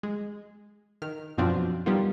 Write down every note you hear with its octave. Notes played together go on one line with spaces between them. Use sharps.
G#3
D#3 F6
F#2 B2 F3 C4 D4 F4
G3 A#3 B3 D#4 F4